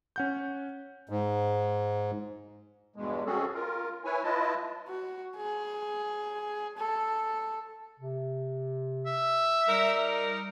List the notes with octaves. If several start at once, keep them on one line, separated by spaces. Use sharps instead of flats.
C#4 F#5 G6
G#2
E2 G2 B2 G#3
C4 C#4 F#4 G#4 A4
F4 A#4
E4 B4 C#5 G#5
E4 F4 B4 D#5 A5
F#4
G#4
A4
C3
E5
G3 D#4 A#4